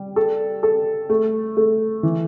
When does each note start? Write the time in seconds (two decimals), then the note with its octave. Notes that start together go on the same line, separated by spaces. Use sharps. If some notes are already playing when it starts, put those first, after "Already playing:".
Already playing: G3
0.16 A4
0.63 A4
1.10 A3
1.57 A3
2.03 E3